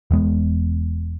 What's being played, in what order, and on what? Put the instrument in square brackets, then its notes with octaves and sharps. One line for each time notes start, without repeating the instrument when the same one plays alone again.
[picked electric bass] E1 E2 G#3 B3